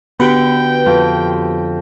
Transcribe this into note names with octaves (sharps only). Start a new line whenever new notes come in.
D3 B3 F#4 G4 B4 G5
F2